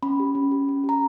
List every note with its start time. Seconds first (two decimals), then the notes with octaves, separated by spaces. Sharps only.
0.03 C#4 B5
0.20 G4
0.35 C#4
0.51 G4
0.69 C#4
0.84 G4
0.89 A#5